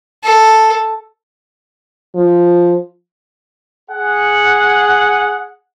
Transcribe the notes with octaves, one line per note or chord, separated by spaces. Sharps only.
A4
F3
G#4 F#5